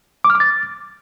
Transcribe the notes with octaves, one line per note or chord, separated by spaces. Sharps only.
D6
F6
D6
A6